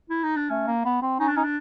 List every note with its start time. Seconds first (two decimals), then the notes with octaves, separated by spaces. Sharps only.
0.10 E4
0.23 D#4
0.37 D4
0.50 A3 C#4
0.67 A#3
0.85 B3
1.02 C4
1.20 C#4 D#4
1.28 D4
1.36 C#4 D#4
1.44 D4